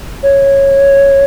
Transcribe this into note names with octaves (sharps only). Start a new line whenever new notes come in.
C#5